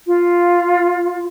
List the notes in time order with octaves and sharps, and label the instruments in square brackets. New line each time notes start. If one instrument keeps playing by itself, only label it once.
[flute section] F4